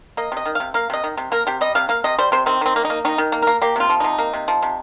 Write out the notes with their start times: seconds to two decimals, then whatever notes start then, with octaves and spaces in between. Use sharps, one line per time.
0.17 A#3 D#5
0.32 C3 D#5
0.45 D#3
0.55 C3 F5
0.74 A#3 F5
0.90 C3 D#5
1.04 D#3
1.17 C3
1.32 A#3 A#4
1.47 C3 G4
1.61 G3 D#5
1.75 C3 F5
1.89 A#3 F5
2.04 C3 D#5
2.18 G3 C5
2.32 C3 C5
2.46 D#3 C4
2.61 D#3 C4
2.76 A#3
2.85 D#4
2.90 A#3
3.05 D#3 D#4
3.18 D#3
3.32 A#3
3.42 A#3 A#4
3.62 A#3 G4
3.76 C3 F4
3.90 F3
4.00 C3 D#4
4.18 A#3
4.33 C3
4.48 F3
4.62 C3